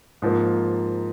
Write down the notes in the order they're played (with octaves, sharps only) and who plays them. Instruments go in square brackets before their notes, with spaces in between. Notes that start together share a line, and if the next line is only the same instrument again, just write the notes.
[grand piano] G#2 F3 A#3